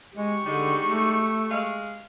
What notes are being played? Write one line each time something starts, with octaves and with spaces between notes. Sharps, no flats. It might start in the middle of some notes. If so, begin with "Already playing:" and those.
G#3 G4 C#6
D3 G3 G#3 D#4
A3
G#3 F5